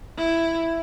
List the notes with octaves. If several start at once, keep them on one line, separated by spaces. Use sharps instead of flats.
E4